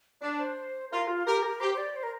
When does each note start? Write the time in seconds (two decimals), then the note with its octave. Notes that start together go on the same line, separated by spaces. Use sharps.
0.21 D4 D5
0.38 C5
0.91 F4 A#4
1.08 F4
1.26 G4 A#4
1.43 A#4
1.60 G4 C5
1.74 C5
1.77 D5
1.96 C5
2.03 A#4